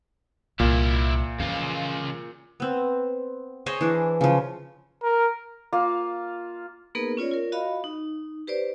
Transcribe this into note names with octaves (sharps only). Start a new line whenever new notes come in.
C2 A#2 E4 F5
C#3 E3 F3 F4
B3 C4
G#4 C5 C#5 D#5
E3 D4
C#3 F3
A#4
A#3 F4 F5
A#3 B3 D#4 G#4 A#4 B4
C#4 F4 C#5 D5
F4 A#4
F#4 D#5 F5 B5
D#4
G4 B4 C5 D5